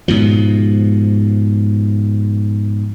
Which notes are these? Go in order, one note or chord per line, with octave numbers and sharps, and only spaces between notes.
G#2 B2 F3